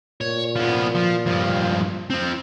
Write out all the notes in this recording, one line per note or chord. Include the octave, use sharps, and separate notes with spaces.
A#2 C#5
F3 B3
F3
G2 F3
F3 C4